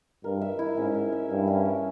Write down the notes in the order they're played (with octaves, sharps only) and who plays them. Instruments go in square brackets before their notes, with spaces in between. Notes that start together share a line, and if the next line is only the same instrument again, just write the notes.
[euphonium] G2 [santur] A#4
[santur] E5
E4
[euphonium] G#2 [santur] C#4
[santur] A#4
E5
[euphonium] G2 [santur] E4
[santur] C#4
A#4